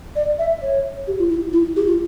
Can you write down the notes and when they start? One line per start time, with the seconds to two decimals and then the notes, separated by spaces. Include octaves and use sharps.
0.15 D5
0.38 E5
0.62 C#5
1.07 G4
1.19 F4
1.30 E4
1.53 E4
1.76 G4
1.87 F4